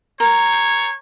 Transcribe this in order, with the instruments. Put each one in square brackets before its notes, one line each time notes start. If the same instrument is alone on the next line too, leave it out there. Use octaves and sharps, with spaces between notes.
[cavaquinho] A#4 [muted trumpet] C#5